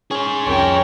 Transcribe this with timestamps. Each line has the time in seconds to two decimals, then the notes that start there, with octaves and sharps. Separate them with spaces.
0.11 C#4 G#4 C5
0.46 C2 F2 F3 C#4 A#4 C#5 G5